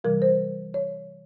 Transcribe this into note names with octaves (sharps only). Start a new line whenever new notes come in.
C3 E3 G3 A#4
C5
C#5